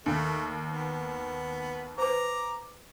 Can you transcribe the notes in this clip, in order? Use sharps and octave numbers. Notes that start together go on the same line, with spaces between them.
D#2 A3
B3
B4 C5 A#5 D6